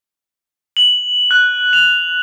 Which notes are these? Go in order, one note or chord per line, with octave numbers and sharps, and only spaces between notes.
F#7
F#6
F7